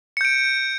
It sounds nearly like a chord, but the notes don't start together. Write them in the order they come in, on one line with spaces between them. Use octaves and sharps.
C#7 G6 D7